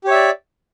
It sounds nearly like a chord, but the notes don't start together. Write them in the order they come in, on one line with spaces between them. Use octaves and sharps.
G4 C#5 E5 D5